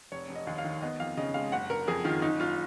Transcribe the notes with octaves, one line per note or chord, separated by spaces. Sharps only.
F1 C#5
F1
D#5
D#2
F5
D#3
B3 D#5
F2 F5
C#3 D#5
G#3 F5
F#1 F#5
F#1 A#4
F2 G#4
D#3 F4
F#1 D#4
F#1 F4